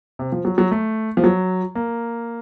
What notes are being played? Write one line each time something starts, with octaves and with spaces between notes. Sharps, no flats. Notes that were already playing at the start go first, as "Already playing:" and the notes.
C3
F3
F#3
F#3
A3
F3
F#3
A#3